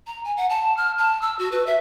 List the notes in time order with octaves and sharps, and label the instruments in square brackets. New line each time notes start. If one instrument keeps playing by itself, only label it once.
[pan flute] A#5
G#5
F#5
A5
F6
A5
E6
F#4
B4
E5